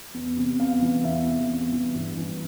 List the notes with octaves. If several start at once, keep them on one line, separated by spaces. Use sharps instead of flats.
E2
C3
E2 F5
E3
E2 E5
C3
E2
E3
G2
E3